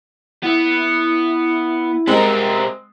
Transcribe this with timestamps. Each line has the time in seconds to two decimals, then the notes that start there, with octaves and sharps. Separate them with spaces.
0.44 B3 E4
2.07 G3 G#3 C4 A#4